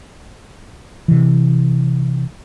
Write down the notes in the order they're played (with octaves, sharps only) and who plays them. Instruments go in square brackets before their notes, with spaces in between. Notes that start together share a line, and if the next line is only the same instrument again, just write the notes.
[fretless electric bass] C3 E3